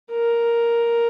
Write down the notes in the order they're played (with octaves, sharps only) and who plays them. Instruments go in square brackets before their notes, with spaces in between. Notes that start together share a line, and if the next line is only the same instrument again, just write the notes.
[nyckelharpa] A#4